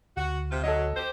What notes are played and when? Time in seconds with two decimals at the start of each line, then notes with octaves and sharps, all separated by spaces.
0.17 D2 F#4
0.51 C3 F4
0.63 F#3 A4 D#5
0.96 G4 C5